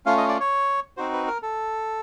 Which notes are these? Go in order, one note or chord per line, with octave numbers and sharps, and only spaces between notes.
A3 C#4 F4 F5
D#5
D5
C#5
C4 D#4 F#4 C5
B4
A#4
A4